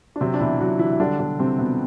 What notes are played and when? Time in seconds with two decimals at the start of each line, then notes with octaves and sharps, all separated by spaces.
0.16 D4
0.20 C3 F#3 C4
0.34 D4
0.40 B2 E3 E4
0.59 B2 F#3 F#4
0.79 E3 F#3 E4
0.91 E4
1.00 D3 G3 D4
1.19 B2 D3 D4
1.39 C3 G3 C4
1.58 B2 B3